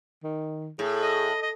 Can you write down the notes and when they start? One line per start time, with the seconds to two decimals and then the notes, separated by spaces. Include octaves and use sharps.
0.24 D#3
0.79 A2 G#4
1.02 D#5
1.42 D#5